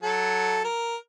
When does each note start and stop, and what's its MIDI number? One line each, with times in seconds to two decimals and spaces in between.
0.03 0.65 54
0.03 0.65 69
0.65 0.96 70